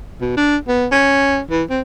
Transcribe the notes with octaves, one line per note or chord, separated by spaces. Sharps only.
B2
D4
B3
C#4
E3
C4